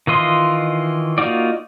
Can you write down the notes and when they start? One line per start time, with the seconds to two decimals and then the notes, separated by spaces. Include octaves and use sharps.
0.07 D#3 E3 F4 D#5 C6
1.18 A#3 D#4 F4 F#4 D5